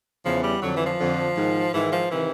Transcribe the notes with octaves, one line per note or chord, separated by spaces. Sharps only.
E2 C#3 E3 F3
G3
F2 D3 F#3
E3
F3
F2 D3
G#2 D#3
G#2 D#3 E3
F3
C3 D#3 E3